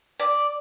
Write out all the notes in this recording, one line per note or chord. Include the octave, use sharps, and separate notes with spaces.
D5